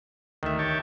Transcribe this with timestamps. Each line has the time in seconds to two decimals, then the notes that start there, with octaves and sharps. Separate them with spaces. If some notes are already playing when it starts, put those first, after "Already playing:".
0.43 D2 D#3 E5
0.59 G4 C#5 A5